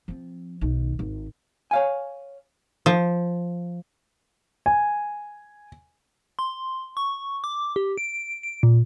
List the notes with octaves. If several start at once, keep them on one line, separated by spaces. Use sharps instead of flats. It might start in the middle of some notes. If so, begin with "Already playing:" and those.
F3 C4
B1 D#3
G#1
C#5 F5 G#5
F3
G#5
C6
C#6
D6
G4
D7
D7
A#2